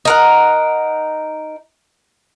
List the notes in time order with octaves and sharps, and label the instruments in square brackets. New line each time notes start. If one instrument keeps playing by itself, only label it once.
[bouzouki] D#4 A#4 F#5